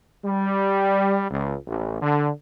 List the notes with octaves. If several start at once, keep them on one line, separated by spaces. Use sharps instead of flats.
G3
C#2
A1
D3